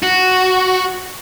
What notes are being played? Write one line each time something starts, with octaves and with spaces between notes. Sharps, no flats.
F#4